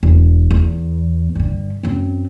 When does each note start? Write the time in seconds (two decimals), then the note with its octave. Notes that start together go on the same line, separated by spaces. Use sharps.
0.03 E1
0.50 E2
1.35 G2 D3
1.83 F#2 C4